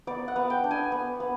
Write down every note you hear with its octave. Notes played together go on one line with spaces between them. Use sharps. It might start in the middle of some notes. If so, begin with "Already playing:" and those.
B3 D5
F#5
B3
G5
D4
G#5
B3
B3